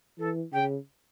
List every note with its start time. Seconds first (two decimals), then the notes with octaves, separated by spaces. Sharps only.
0.19 E3 A4
0.52 C#3 G5